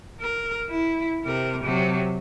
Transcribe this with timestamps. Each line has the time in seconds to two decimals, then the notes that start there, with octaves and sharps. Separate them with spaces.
0.20 A#4
0.70 E4
1.24 C3 A#4
1.64 C3 F#3